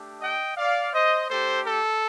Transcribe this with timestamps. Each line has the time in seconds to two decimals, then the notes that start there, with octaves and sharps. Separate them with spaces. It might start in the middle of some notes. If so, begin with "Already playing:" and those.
Already playing: A3 D4 G4
0.22 D#5 G5
0.57 D5 F5
0.93 C5 D#5
1.29 A3 D4 G4 A4 C5
1.65 A4